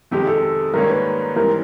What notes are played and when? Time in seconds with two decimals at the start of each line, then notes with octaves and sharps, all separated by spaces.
0.11 F2 C3 D#3 G#3 G4
0.27 A4
0.74 G#2 D#3 G3 A#3 C#4 A#4
0.89 B4
1.35 G#2 E3 G3 C4 A#4